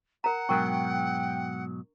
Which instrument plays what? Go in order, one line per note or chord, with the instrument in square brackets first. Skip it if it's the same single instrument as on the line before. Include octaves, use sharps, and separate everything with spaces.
[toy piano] A#4 A#5 [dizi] F#5
[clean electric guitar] G#2 B2 F#3 [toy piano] D4 A#4 C#6 [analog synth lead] G5